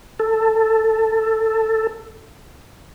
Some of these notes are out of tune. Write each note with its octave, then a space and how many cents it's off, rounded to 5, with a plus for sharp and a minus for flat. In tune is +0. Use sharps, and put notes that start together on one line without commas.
A4 +10